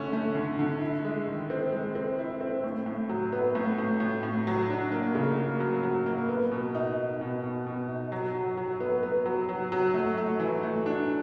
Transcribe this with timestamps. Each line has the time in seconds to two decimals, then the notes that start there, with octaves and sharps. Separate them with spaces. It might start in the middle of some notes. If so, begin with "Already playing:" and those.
Already playing: D3 A3 C#4
0.13 A3
0.35 D3
0.59 D3
0.81 E4
1.05 G#3
1.27 D#3
1.50 C4
1.72 G#3
1.95 C4
2.19 E4
2.41 C4
2.64 A2
2.86 A2
3.09 F#3
3.32 B3
3.55 A2
3.78 A2
4.00 A2
4.23 A2
4.47 F#3
4.70 D4
4.92 A#3
5.15 C#3
5.37 A#3
5.60 F#3
5.83 F#3
6.06 A#3
6.29 B3
6.52 B2
6.75 D#4
6.98 D#4
7.21 B2
7.44 B2
7.67 B2
7.89 D#4
8.12 F#3
8.35 F#3
8.57 F#3
8.80 B3
9.03 B3
9.26 F#3
9.49 F#3
9.72 F#3
9.94 A3
10.18 A3
10.40 E3
10.63 A3
10.86 D4